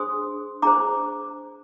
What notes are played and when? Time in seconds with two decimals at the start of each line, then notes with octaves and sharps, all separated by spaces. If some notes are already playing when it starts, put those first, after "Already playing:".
Already playing: D4 G#4 C5 C6 D#6
0.62 D4 G#4 C5 A#5 D6